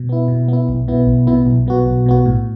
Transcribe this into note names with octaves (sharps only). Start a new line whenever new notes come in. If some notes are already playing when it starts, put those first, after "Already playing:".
Already playing: B2
B3 E4
B2
B3 E4
B1
B2 B3 E4
B1
B2 B3 E4
B1
B2 B3 F#4
B1
B2 B3 F#4
A2